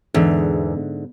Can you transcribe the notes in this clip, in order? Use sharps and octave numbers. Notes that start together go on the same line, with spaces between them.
E2 G#2 D3 E5